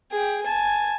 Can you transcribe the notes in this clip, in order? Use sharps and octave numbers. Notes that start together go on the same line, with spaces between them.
G#4 G5
G#5 A5